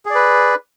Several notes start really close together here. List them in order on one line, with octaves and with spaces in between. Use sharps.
G#4 D5 B4